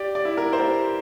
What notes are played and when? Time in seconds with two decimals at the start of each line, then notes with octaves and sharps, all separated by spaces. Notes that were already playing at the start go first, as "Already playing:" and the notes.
Already playing: G4 D5
0.15 D5
0.25 E4
0.37 A#4
0.53 C5
0.59 G4 A#4